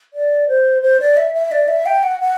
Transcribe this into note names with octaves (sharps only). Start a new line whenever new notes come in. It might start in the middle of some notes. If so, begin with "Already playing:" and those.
D5
C5
C5
D5
E5
E5
D5
E5
G5
F#5
F#5